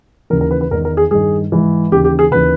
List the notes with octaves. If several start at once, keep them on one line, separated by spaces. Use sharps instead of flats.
D#2 C#3 E3 A#4
A#4
B4
B4
E2 D#3 A#4
A#4
G#4
G2 D#3 G#4
G#2 E3
D#2 C#3 E3 G4
G4
G#4
D#2 C#3 E3 B4